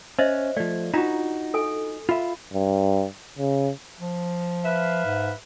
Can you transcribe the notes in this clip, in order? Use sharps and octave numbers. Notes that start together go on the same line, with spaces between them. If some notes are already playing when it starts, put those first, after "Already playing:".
C#4 C5 D#5 E5
F3 A3 D5
D4 D#4 F4 F#4 A#5
A4 G#5
F4 E5 B5
G2
C#3
F3
B4 E5 F5
G#2